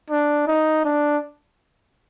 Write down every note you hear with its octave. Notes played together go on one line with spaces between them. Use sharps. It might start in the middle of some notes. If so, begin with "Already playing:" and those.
D4
D#4
D4